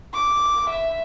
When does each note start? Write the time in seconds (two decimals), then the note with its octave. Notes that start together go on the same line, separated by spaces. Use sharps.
0.14 D6
0.70 E5